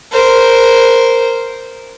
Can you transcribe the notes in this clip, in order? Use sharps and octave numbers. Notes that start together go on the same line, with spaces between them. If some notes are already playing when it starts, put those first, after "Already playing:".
A#4 C5